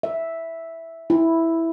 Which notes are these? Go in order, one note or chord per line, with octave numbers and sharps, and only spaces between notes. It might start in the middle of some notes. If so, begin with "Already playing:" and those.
E5
E4